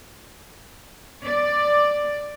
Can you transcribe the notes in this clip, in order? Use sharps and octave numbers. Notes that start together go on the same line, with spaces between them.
D5